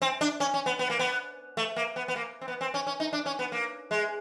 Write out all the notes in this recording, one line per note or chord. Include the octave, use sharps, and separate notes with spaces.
C4
D4
C#4
C#4
B3
B3
A#3
B3
A3
A#3
B3
B3
A#3
C4
B3
C4
C#4
C#4
D#4
D4
C#4
B3
A#3
G#3